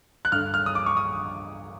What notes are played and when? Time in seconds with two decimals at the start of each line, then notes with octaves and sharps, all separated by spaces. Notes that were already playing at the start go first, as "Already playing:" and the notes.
0.25 F#6
0.32 G2 D3 F6
0.54 F6
0.66 D#6
0.75 D6
0.86 C#6
0.97 D#6